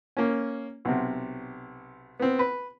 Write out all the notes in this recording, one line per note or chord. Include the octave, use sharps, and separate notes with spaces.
A#3 C#4
B1 C3
B3 C4
B4